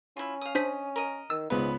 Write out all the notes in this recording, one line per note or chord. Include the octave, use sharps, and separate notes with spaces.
C#4 E4 F4
F5 D#6
D4 C5 D#5 B6
A#4 D#5
D#3 E6
C#2 G#2 B3 B4